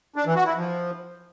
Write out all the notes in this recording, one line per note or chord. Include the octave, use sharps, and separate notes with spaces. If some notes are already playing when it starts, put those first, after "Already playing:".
D4
E3
F#4
E4
F3